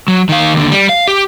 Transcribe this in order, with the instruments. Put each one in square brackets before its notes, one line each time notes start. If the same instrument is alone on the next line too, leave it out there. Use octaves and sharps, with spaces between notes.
[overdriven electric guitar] F#3
D#3 F5
D#2 D3
G3
F5
G4